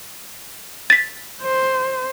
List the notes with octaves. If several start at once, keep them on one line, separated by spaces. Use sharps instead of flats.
A6 B6
C5